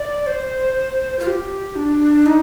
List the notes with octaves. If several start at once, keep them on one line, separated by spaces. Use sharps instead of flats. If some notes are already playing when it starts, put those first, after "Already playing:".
Already playing: D5
C5
F4
G4
D4
D#4